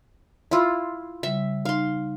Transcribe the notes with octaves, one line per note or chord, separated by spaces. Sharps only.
E4 F4 B5 C6 E6
C#3 G3 E5
D#4 F5 C6